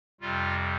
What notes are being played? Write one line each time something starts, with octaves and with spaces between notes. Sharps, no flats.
F2 C3 G3 F4